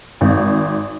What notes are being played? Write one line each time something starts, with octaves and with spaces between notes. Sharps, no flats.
G#1